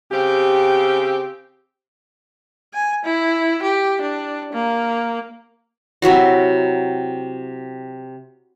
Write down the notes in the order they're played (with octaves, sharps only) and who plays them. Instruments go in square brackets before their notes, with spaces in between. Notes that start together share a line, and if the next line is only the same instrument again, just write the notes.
[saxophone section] C#3 C4 G4
[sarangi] G#5
E4
G4
D4
A#3
[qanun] C3 F#3 E4 F#4